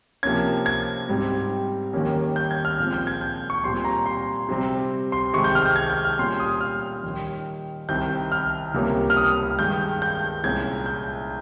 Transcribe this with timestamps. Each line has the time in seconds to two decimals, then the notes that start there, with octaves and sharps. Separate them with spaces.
0.23 C3 F3 A#3 C#4 G#6
0.66 G#6
1.09 G#2 G3 C4
1.93 D#2 D#3 G3 A#3 C#4
2.36 G6
2.51 G#6
2.65 F6
2.78 A#2 F3 G#3 C4 F6
2.93 G6
3.07 G#6
3.21 G6
3.50 C#6
3.64 A#2 G3 C4 C6
3.85 A#5
4.06 C6
4.49 C3 G3 C4
5.12 C6
5.33 C3 D#3 G#3 C#6
5.44 G6
5.55 F6
5.66 G6
5.76 G#6
5.90 G6
6.05 F6
6.19 A#2 G3 C#4 C6
6.39 D#6
6.61 F6
7.04 D#2 D#3 G3
7.89 C2 C3 D#3 G6
8.32 F6
8.74 C#2 C3 G3 A#3 C#4
9.10 F6
9.17 D#6
9.58 G2 D#3 G#3 G6
10.02 G6
10.43 C2 A#2 G#3 C#4 G#6
10.86 G6